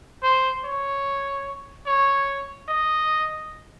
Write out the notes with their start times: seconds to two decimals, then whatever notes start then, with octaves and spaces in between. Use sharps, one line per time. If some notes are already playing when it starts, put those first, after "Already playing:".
0.23 C5
0.65 C#5
1.87 C#5
2.69 D#5